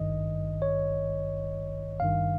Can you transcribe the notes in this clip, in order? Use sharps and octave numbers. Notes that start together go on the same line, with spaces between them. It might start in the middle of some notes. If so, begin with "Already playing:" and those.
Already playing: G#1 G2 D#3 D#5
C#5
G#1 G2 D#3 F5